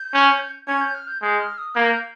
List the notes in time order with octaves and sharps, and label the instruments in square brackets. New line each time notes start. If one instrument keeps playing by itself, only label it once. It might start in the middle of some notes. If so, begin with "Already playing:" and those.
Already playing: [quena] G6
[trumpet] C#4
[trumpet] C#4 [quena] G#6
[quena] G6
F6
G6
[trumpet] G#3 [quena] G6
[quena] F6
D#6
[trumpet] A#3 [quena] G6 G#6